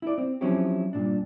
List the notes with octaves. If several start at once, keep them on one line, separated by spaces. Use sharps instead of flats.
E4 D5
C4
F3 F#3 C4 C#4 E4 G4
G2 A#2 D4